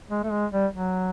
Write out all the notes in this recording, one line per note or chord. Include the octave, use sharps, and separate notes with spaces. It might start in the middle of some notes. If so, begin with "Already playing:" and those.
G#3
A3
G#3
G3
F#3